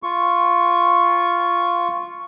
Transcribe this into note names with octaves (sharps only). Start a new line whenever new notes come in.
F4 C#6